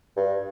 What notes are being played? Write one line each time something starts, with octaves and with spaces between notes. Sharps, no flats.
G2